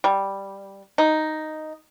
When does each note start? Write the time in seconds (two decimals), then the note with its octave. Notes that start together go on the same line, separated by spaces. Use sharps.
0.04 G3
0.98 D#4